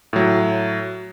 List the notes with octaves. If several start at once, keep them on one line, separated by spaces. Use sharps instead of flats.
A2 F#3